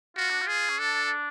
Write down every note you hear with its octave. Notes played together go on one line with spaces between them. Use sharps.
F4 F#4
D4
F4
G#4
C#4
D4 A4